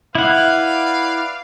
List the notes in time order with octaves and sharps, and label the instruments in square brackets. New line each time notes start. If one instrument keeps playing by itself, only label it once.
[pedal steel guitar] E4 F#5 [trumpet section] B4 D5 F5